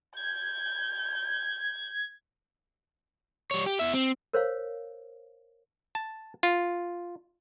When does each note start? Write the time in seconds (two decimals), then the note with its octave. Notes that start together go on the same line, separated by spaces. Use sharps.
0.17 G6 G#6
3.51 G3 C#5
3.66 G4
3.79 E2 E5
3.94 C4
4.33 A#4 C5 C#5 F5
5.95 A5
6.43 F4